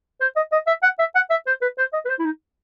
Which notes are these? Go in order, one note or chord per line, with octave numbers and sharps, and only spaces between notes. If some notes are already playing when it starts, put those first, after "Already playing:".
C5
D#5
D#5
E5
F#5
E5
F#5
E5
C5
B4
C5
D#5
B4
C5
E4
D#4